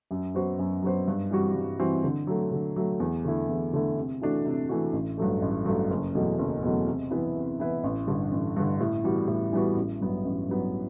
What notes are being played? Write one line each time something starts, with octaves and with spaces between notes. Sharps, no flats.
F#2
F#3 B3 F#4 C5
F#2
F#3 B3 F#4 C5
G2
E3 G3 C4 F#4
G2
E3 G3 C4 F#4
D3
F#3 A3
D3
F#3 A3
E2
D3 A3 E4
E2
D3 A3 E4
C3
E3 A3 D4 F#4
C3
E3 A3 D4 F#4
A1
G2 F#3 A3
A1
G2 F#3 A3
F#1
E2 B2 F#3 A3
F#1
E2 B2 F#3 A3
C3
E3 B3 E4 B4
C3
E3 B3 E4 B4
A1
G2 D3
A1
G2 D3
A2
E3 G3 B3 F#4
A2
E3 G3 B3 F#4
A1
G2 F#3 B3
A1
G2 F#3 B3